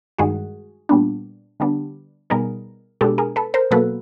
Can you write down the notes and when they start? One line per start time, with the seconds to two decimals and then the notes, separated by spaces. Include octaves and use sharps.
0.18 G2 D#3 G#3 F#4 G#4
0.89 A#2 G3 B3 D4
1.60 D3 G3 B3 D4
2.30 B2 G3 B3 D#4 G#4 A#4
3.01 B2 G#3 B3 D4 G4 A4
3.18 G#4 A#4
3.36 A4 B4
3.54 A#4 C5
3.71 B2 F#3 A#3 A4 B4